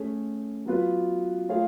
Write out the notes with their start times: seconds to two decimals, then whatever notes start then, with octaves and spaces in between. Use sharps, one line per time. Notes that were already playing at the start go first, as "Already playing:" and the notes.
Already playing: A3 C#4 G#4
0.65 F#3 B3 F4 B4
1.49 A3 F4 G#4 C#5 F5